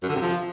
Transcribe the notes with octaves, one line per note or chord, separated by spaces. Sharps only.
F#2
D3
C3
F3